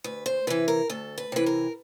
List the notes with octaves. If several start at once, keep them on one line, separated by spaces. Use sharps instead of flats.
D2 B4
C5
C3 E3 B4
A#4
D2 A4
B4
C3 E3 B4
A#4